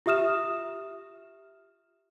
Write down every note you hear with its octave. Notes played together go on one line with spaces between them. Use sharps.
F4 G4 E5 D#6 F6 E7